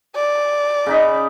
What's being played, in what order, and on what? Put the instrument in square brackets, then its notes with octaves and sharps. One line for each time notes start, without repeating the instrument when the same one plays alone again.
[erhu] D5
[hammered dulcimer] C#3 D#4 B5